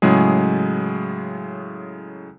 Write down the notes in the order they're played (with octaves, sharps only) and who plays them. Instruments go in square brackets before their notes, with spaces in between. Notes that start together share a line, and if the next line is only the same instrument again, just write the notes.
[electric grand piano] A2 C#3 F#3 G#3 G#4